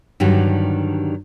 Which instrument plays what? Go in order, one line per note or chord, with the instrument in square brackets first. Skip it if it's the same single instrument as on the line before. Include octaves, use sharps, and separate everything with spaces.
[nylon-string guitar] G2 D3 D#3 F#3 G3